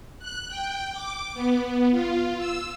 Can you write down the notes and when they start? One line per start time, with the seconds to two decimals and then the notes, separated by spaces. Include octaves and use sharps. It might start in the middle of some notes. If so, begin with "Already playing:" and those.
0.19 F#6
0.49 G5
0.93 D6
1.34 B3
1.91 F4
2.37 E6